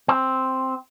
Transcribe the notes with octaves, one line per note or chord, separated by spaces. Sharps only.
C4